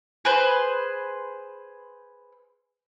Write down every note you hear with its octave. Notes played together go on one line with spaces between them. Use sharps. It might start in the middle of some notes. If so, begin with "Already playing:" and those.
G#4 B4 C5